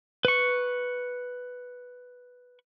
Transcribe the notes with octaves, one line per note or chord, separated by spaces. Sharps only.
B4 C#6